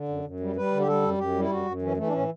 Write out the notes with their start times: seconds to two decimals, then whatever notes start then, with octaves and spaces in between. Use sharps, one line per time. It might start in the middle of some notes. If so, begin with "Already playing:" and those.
Already playing: D3
0.08 F#2
0.25 F#2
0.40 G3
0.56 G3 B4
0.72 D3
0.79 G4
0.87 G3 A4
1.02 F#2
1.18 F#2 G4
1.34 G3
1.40 E4
1.50 F#2 F#4
1.66 F#2
1.82 E3 C#4
1.97 E3 A3
2.07 D4
2.13 A2 C#4